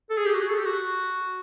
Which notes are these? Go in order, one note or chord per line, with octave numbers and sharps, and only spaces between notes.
A4
G#4
G4
F#4
G#4
A4
G4
F#4